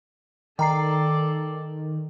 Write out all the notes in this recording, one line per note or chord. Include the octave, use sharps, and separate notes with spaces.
D#3 A4 D5 G5 A#5 C7